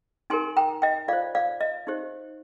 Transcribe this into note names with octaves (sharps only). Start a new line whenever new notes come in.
D#4 G4 A#4 G#5 C6
G5 A#5
D#5 G5
F4 C5 D5 F5
D5 F5
D#5
D#4 G4 C5